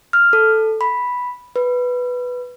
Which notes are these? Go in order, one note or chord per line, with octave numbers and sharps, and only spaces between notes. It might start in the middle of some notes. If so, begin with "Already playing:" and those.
F6
A4
B5
B4